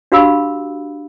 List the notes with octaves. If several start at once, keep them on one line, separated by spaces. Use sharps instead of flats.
D4 F#4 G4 F5 B5 E6